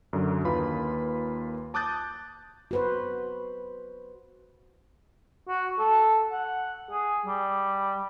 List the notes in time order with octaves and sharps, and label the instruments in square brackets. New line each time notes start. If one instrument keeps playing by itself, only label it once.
[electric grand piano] F#2 D3 F#3
D#2 A#3 F4 B4 B5
A5 D6 D#6 F#6 G6 A6
[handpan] F#4 B4 C5
[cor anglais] F#4
A4
F#5
G#4
G3